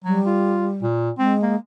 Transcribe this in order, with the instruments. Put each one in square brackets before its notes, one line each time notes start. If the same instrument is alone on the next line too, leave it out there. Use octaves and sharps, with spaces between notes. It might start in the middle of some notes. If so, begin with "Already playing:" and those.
[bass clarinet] F#3 [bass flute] G3
[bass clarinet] F4
A#2
[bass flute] G#3 [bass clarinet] C4
[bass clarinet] A#3